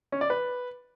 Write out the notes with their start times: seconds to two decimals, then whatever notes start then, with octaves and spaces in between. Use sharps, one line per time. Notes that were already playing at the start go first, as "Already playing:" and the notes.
0.12 C#4
0.21 D5
0.30 B4